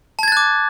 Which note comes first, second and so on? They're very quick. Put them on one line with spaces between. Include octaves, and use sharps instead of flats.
A5 G#6 A6 F#6 D6